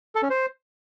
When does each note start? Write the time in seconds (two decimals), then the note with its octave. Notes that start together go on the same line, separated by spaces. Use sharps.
0.15 A4
0.23 C#4
0.30 C5